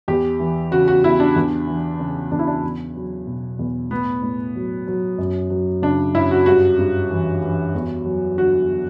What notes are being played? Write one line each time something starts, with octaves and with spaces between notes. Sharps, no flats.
E2 G4
E3
C#3 F#4
F#4
E2 E4
D4
E2
E3
C#3
E2 D4
E4
D4
E2
F#3
B2
E2
A2 B3
A2
F#3
F#3
F#2
F#3
C#3 D4
F#2 E4
F#4
G2 F#4
G2
E3
E3
E2
F#3
D3 F#4